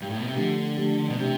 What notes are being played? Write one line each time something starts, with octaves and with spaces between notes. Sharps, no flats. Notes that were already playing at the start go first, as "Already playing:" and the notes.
G2
A2
B2
C3
D3 F3 A3 D4 G4
F3 A3 D4 G4
B2
C3 E3 A3 D4 G4